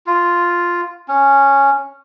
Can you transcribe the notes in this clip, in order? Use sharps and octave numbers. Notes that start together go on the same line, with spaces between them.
F4
C#4